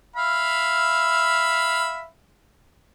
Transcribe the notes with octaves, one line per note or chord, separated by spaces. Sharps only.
E5 F5 B5